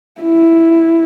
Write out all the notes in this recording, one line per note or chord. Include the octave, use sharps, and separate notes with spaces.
E4